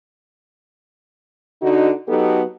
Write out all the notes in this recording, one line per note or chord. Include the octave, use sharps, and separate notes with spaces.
D3 D#4 F#4
F#3 B3 D#4 G4 A4